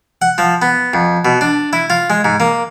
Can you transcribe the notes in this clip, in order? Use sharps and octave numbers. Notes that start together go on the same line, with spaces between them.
F#5
F3
B3
F2
B2
D4
E4
F4
G#3
G#2
A#3